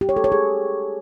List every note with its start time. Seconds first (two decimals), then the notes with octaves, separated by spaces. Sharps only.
0.01 G4
0.09 C#5
0.16 A4
0.24 C#5
0.32 G#4